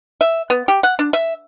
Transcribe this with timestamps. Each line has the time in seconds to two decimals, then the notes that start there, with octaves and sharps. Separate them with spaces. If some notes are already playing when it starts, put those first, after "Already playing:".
0.21 E5
0.50 B3
0.68 G4
0.83 F#5
0.99 D4
1.13 E5